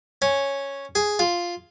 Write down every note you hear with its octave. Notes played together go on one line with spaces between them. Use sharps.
C#4
G#4
F4